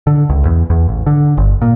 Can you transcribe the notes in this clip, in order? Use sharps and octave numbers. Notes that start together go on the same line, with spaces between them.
D3
C#2
E2
E2
A1
D3
G1
A#2